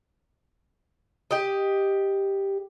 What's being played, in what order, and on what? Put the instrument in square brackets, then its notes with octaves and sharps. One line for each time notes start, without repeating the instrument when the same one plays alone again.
[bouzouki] G4 D#5